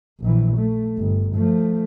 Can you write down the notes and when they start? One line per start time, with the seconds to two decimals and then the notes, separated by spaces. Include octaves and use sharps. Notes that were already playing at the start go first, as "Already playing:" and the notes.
0.21 A#1 E3
0.57 A3
0.98 G1
1.35 F3 A3